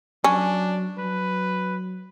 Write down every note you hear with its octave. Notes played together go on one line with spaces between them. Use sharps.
F#3 C#4 D4
F#3 B4